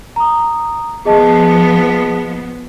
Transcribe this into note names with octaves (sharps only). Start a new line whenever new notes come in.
A#5 D#6
F3 B3 G#4 D#5 A5